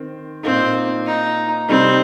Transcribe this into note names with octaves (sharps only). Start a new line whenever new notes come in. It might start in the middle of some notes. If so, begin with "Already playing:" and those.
Already playing: D#3 C4
A#2 A#3 C4 D#4
D#4
C3 G3 C4 D#4